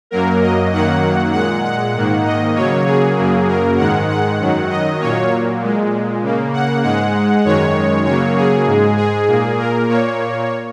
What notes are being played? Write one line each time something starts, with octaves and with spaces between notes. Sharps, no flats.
F#2 F#3 A#3 A#4
D#5
F#2 D#3 F#3 A#3 F#5
A#2 G#3 F#5
F#5
G#2 D#3 A#3
D#5
C#3 F#3 A#3 C#5
G#4
F#2 C#3 F#3 A#3
A#4
G#2 D#3 G#3 F#5
F#5
F#2 D#3 F#3
D#5
A#2 F#3 A#3 C#5
A#2 G#3
C#3 A#3
F#5
G#2 G#3 F#5
F#2 D#3 G#3 C#5
C#3 F#3 A#3 C#5
G#4
G#2 G#3
G#4
A#2 A#3
A#4
A#2 A#3 C#5